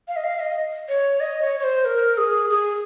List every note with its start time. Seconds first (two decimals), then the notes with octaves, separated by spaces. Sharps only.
0.08 F5
0.16 D#5
0.24 F5
0.39 D#5
0.89 C#5
1.20 D#5
1.42 C#5
1.60 C#5
1.64 C5
1.85 A#4
2.17 G#4
2.50 G#4